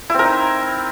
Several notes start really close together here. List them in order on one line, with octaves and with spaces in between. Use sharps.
E4 C4 A#4 D#4